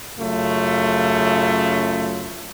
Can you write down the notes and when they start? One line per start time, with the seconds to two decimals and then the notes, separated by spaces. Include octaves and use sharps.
0.19 F#2 C#3 A3 F4